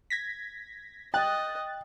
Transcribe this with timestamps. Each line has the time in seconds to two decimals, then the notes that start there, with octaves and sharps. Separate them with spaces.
0.10 G#6 A#6 B6
1.14 D#5 G5 F#6 A6